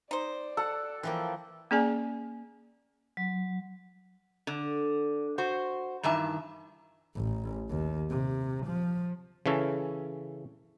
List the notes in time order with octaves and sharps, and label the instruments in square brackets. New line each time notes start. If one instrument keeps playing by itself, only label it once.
[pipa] D#4 C5 [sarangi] D5
[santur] A4 [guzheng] F#5
[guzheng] E3 F3 A#3 [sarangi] G5
[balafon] A#3 C#4 G#4 D5 G#5
[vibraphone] F#3
[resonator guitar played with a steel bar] D3
F#4 C5
G2 D#3 E3 E5 A5
[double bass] A1
D#2
C3
F3
[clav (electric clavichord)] C#3 E3 C#4 A4